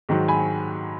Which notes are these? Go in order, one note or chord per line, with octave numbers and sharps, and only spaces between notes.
G#2 D#3 F#3
G#5 B5